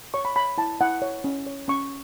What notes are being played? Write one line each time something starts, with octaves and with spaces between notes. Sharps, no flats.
C#5 C#6
B5
C#5 B5
E4 A5
E4 F#5
C#5
C#4
C#5
C#4 C#6